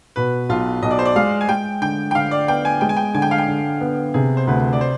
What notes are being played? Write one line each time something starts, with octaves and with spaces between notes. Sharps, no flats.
B2 B4
B1 F4
B1 D#5
D5
C5
D5
G#3 F5
G#5
G#3 G5
D3 G5
G5
D3 F5
D5
B3 G5
G#5
G#3 G5
G#5
G5
D3 G#5
G5
F5
G5
D3
B3
C3 G#4
C5
D2 B4
D5
C5